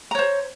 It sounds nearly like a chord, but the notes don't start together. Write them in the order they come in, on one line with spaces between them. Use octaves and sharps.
A#5 C#5 C5